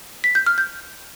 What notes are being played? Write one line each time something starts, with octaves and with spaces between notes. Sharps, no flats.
B6
G6
F6
G6